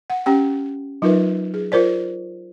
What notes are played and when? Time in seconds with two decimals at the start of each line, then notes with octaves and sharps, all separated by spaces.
0.10 F#5
0.26 C#4 G4 G5
1.02 F#3 D#4 F4 A#4 B4 E5
1.54 G#4
1.72 F4 A#4 C5 D5